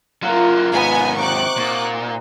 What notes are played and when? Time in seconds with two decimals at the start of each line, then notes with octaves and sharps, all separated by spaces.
0.23 F#3 A#3 F4 A#4 F5
0.72 D#2 G#2 B3 G#5
1.17 C3 D#4 F#5 C#6 D6 F#6
1.57 A#2 D#4